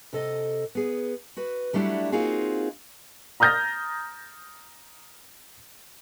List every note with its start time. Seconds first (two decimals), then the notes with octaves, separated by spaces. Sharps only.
0.13 C3 A4 D#5
0.75 B3 G#4
1.37 F#4 B4
1.73 F#3 G3 A3 D4 E4 F#4
2.12 A#3 C4 D#4 F4 F#4 G#4
3.40 A#5 D#6 F6 G6 A6 A#6